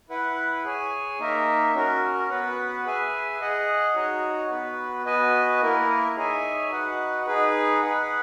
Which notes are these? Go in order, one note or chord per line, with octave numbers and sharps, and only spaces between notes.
E4 B4 F#5
G#4 C#5 G#5
A#3 D#4 A#4 E5
C#4 F#4 A#4
B3 F#4 B4 F#5
G#4 B4 E5 G#5
G#4 D#5 F#5
D#4 F#4 C#5
B3 F#4 B4
B3 F#4 B4 D#5 G#5
A#3 E4 A#4
D#4 G#4 C#5 E5 G#5
D#4 F#4 B4 F#5
D#4 G#4 B4
G#4 B4 F#5